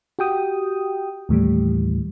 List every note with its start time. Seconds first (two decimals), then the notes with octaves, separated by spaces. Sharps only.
0.19 F#4 G4 G5 D#6
1.29 D#2 A2 E3 G3